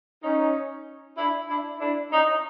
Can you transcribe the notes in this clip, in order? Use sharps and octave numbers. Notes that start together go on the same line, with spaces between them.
C#4 D#4
D4 E4
D4 E4
D4 E4
C#4 D#4